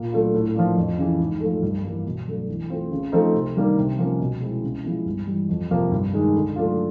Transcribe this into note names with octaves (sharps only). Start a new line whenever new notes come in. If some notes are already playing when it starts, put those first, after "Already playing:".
Already playing: A#2
F#3 A3 D4 F4
A2
F3 A#3 D4 F4
F2
C#3 E3
G#2
F3 A3
G2
E3 G3 A#3
B2
F#3 A3 D4
E3
A3 C4 F4
C#3
F3 A3 C4 D#4
C3
D#3 G3 A#3 D4
C3
F3 A#3 C#4
B2
G#3 C4 E4
C#3
F3 G#3 B3 E4
G2
E3 G3
F2
C3 F3 A#3
G2
D#3 G#3
D3
F#3 A3 D4 F4